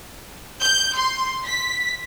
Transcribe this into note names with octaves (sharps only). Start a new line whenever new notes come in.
G6
C6
B6